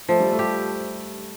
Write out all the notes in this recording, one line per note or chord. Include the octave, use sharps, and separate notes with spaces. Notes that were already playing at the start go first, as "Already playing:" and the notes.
F3 A3
G3
A3
G4